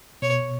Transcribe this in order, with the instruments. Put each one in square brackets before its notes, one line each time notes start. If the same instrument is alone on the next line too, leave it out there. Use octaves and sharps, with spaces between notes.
[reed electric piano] B2 [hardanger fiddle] C#5